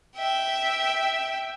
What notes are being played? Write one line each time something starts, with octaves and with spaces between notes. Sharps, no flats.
E5 G5